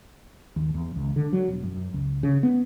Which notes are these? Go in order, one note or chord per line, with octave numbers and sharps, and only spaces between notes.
D#2
E2
C#2
D3
F#3
E1
F#2
C#2
C#3
B3